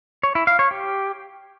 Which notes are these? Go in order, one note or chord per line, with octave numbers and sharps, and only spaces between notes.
C#5
E4
F5
C#5
G4